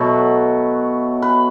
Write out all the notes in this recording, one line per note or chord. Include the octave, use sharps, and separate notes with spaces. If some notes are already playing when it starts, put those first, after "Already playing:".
Already playing: B2 F#3 A3 B4
B4